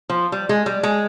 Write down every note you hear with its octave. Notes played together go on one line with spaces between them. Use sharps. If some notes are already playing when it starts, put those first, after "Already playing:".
F3
G3
G#3
G3
G#3